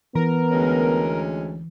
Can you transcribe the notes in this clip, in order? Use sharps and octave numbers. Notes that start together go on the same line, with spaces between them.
E3 B3 A#4
D2 G#3 C#4